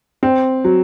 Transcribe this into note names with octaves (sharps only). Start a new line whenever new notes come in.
C4
F#3